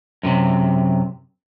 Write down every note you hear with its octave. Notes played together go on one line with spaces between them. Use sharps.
F#2 A2 C3